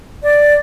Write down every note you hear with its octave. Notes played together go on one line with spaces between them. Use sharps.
D5